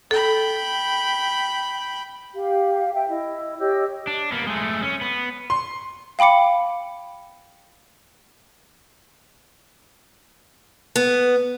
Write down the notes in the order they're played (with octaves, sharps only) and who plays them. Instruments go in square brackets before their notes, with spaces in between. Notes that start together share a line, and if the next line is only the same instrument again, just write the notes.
[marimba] A4 [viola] G5 B5
[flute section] G4 F5
E5 G5
E4 D#5
G4 C#5 D#5 E6
[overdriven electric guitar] D4
A#3 B3
G#3 A3
C#4
B3
[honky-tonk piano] C6
[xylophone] F5 G5 B5 D6 C#7
[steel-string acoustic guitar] B3